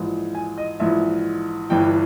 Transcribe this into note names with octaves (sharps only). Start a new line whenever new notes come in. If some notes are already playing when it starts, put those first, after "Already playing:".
Already playing: A#1 G#2 E3
G#5
D#5
A#1 G#2 E3 E5
G1 G2 E3 G5